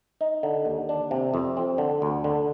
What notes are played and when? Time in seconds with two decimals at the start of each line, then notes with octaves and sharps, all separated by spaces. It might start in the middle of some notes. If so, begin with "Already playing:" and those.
0.21 D#4
0.43 D3
0.65 D#2
0.89 D4
1.11 C3
1.34 F2
1.57 C4
1.78 D3
2.02 D2
2.24 D3